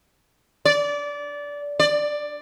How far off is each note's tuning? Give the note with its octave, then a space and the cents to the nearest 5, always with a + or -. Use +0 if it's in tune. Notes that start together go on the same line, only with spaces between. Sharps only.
D5 -20
D5 +10